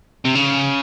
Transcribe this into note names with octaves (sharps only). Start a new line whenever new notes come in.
C3
C#3